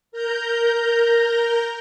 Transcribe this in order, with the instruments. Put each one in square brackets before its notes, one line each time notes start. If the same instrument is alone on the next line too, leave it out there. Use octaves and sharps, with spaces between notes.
[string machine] A#4 A#5 G6